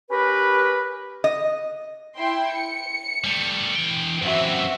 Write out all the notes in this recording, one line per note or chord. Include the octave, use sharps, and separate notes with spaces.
C#4 G4 A#4 B4
D#5
E4 G5 C6
C#7
G3 A3
E3 G5
F#2 E3 C4 F#4 E5